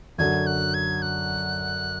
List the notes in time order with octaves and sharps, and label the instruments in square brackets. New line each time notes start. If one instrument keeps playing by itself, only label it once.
[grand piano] F#2 D3 F#3 [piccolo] G#6
[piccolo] F#6
G#6
F#6